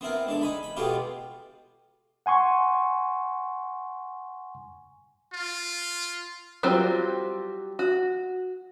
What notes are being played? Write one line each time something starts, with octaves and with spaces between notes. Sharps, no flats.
B3 C4 E4 A#4
G#3 D4 A4
D#4 G#5 B5
B5
B2 G#3 B3 F4 G4 A4
F#5 G#5 C6 C#6
F4
F#3 G3 C4 F4 C5
F#4